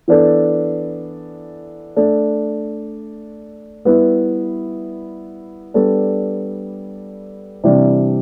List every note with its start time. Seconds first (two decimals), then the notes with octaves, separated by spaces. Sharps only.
0.08 E3 B3 D4 A4
1.96 A3 D4 A4
3.85 G3 B3 E4 B4
5.74 G3 B3 D4 A4
7.64 C3 E3 G3 D4